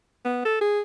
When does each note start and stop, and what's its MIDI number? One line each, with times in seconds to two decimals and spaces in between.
0.25 0.44 59
0.45 0.60 69
0.61 0.81 68